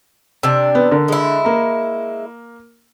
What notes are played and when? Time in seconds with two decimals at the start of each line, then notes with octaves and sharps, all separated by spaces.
0.43 C3 D4 E6
0.75 B3
0.91 D3 A#4
1.08 G#3 E4
1.45 A#3 A#5